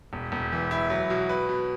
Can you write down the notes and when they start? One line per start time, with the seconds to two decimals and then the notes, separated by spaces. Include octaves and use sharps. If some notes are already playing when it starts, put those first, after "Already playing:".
0.13 E1
0.32 E1
0.52 E3
0.71 E4
0.90 F#3
1.10 B2
1.29 B4
1.49 B2